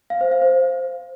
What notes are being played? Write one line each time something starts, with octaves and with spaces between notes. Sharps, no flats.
F5
C5
F5
C5